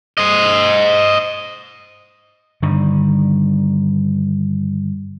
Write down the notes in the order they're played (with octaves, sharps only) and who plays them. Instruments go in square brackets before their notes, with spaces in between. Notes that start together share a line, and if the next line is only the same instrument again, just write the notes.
[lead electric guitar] C5 D#5
[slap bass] G2 D3 D#3